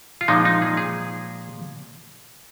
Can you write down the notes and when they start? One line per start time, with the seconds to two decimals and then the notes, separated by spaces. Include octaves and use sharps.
0.21 F4
0.28 A#2 F3 G#3 D#4
0.45 D#4
0.62 G#4
0.77 G#4